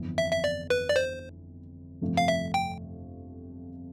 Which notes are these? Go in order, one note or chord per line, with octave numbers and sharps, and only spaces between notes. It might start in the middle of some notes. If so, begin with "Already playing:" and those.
Already playing: G1 F2 E3 B3
E5
E5
D5
B4
D5
C5
G1 F2 C3 F3 A3
F5
E5
G5